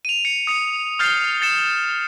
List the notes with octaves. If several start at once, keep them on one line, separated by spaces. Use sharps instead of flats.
D#7 F7
C#7
D#6 C#7
D#6 F6 G6 A6 C7 G7
A6 C#7 E7